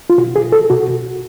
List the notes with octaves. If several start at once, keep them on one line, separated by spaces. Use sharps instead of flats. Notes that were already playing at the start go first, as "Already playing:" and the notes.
F4
B2 F#4
G#4
A4
B2 F#4